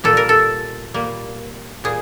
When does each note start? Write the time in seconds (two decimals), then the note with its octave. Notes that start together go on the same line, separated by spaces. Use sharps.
0.04 A#2 G3 A#3 A4
0.17 A#4
0.29 A4
0.94 A#2 G3 A#3
1.84 A#2 G3 G#4